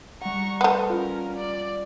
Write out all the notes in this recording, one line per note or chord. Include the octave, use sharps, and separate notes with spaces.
G3 F#5 A#5 C#6
A3 B3 A#4 C5
C#4 F4 A#4
D5